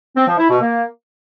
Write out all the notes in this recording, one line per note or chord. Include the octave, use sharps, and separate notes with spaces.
C4
F3
E4
B2
A#3